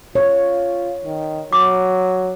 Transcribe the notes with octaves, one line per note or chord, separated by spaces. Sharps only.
F4 C#5
D#3
F#3 D6